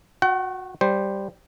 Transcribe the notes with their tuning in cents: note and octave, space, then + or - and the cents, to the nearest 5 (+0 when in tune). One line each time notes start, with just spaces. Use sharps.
F#4 -20 F#5 +40
G3 +0 C5 +0